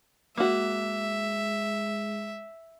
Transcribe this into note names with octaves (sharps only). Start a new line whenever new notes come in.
G#3 A#3 F#4 E5